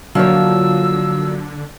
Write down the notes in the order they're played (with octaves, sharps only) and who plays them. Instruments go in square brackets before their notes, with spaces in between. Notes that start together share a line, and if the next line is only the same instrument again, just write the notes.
[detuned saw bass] D3 [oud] F3 C#5 [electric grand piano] F#3 A#3 D4 [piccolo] E6